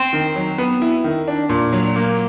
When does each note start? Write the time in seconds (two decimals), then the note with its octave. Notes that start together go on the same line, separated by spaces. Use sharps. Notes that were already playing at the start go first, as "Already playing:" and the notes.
Already playing: C4
0.13 D#3
0.36 F#3
0.58 B3
0.82 E4
1.04 D#3
1.28 D4
1.49 A#2
1.72 F#3
1.96 A#3